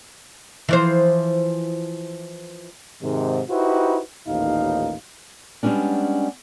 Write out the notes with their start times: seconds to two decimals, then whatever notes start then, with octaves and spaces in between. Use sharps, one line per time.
0.69 E3 F3 C5
3.02 G#2 C3 D#3
3.50 D#4 E4 F#4 G4 B4 C5
4.28 A1 D#2 A#2 D#4 F5
5.63 G3 G#3 B3 C#4 D4